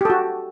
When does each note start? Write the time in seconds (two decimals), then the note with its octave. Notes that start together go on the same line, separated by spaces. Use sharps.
0.01 G4
0.05 A4
0.10 F#4